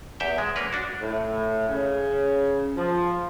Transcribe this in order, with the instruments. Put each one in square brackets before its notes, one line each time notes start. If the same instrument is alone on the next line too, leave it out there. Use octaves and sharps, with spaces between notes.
[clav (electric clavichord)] E2 G4 E5 G5
G#3
A#3 C#4 A#4 B4
D4 F#4
[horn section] A2
C#3
F3